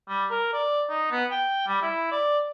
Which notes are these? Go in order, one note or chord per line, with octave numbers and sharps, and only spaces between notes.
G3
A#4
D5
D#4
B3
G5
G3
E4
D5